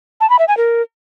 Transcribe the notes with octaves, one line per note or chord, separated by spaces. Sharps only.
A5
B5
E5
G#5
A#4